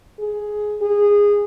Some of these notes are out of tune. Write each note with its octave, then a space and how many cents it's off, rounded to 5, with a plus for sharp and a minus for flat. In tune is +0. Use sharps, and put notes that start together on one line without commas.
G#4 +10
G#4 -15